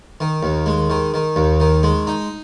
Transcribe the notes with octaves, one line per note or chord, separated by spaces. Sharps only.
D#3
D#2
G#3
D#3
D#3
D#2
D#3
G#3
D#4